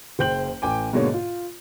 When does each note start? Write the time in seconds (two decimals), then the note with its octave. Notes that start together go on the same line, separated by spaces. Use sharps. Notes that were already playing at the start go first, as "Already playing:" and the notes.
0.19 F#1 C5 G5 G6 F#7
0.62 A1 G5 G#5 D6
0.93 G#2 B2 D3 A#3 C#5
1.14 F4